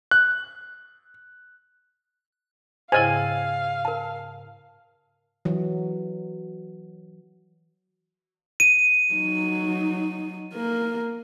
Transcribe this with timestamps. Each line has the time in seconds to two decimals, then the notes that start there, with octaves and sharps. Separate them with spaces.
0.11 F#6
2.92 G#2 C#3 E4 C5 D#5 F5 G5 G#5
3.85 A#4 A5
5.45 E3 F#3
8.60 D#7
9.13 F#3 D#4
10.54 A#3 A#4